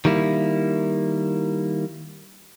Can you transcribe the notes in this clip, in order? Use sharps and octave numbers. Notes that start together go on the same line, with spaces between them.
D#3 G3 A#3 E4